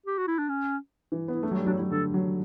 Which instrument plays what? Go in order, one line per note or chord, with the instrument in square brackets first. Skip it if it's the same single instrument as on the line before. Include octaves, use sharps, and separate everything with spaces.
[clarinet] G4
F#4
E4
D4
C#4
[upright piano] E3
B3
[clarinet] E4
[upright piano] A3 [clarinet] D4
[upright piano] F#3
[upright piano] G3 [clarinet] F#4
[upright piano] F#3 [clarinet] D4
[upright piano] F#3 [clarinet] E4
[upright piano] D3 [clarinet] A4
[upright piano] F#3